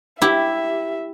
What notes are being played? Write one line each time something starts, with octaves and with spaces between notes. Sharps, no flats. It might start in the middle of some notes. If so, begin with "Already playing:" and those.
E4 G4 E5